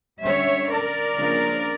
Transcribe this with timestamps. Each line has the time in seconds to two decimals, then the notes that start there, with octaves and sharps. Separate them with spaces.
0.23 D3 G3 C#4 C#5 E5
0.69 A#4 D5
1.15 C#3 F3 A#3 D4 F4